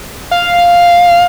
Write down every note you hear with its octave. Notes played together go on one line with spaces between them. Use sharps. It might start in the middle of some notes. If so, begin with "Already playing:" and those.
F5